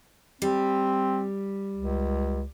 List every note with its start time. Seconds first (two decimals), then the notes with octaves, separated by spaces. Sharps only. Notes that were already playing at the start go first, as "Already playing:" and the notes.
0.42 G3 C4
1.76 C#2